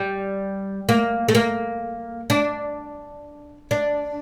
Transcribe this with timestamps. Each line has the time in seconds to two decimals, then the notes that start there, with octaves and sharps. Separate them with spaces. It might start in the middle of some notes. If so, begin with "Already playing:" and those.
Already playing: G3
0.89 A#3
1.29 A3
1.35 A#3
2.30 D4
3.71 D4